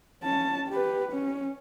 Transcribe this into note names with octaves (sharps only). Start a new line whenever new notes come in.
C#4 A5
G4 B4
C#4